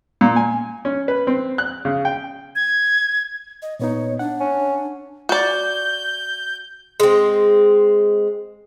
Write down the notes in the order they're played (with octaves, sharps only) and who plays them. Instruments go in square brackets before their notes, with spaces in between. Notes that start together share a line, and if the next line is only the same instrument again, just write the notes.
[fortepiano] A#2
G#5
C#4
B4
C4
F#6
C#3
G5
[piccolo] G#6
[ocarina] D#5
[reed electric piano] A#2 B3 D#4 [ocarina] C#5
[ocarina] D4 [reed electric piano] F#5
[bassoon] C#4
[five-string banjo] F#4 D5 [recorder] G6
[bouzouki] G#3 C4